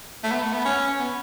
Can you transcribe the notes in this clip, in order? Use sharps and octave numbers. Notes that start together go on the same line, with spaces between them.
A3
B3
A3
B3
C#4
B3